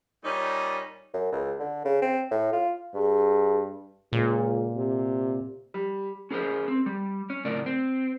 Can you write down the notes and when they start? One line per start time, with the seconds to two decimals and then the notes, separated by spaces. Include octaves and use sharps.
0.25 A#2 G3 C#4 D#4
1.14 F#2
1.32 C#2
1.59 D3
1.85 C#3
2.02 C4
2.31 A2
2.53 F4
2.95 G2 G#4
4.13 C#2 A#2
4.75 C3
5.74 G3
6.31 C#4 G#4 A#4 C5
6.68 C4
6.86 G3
7.30 C#4
7.45 F#2 A2 C#3 A#4 D5
7.66 C4